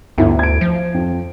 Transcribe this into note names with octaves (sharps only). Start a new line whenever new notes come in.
G1 D2 E4
G#6 D7
F3
F2